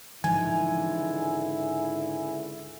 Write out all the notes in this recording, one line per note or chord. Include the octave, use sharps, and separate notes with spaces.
C#2 G#2 D3 E3 F3 E4 G#5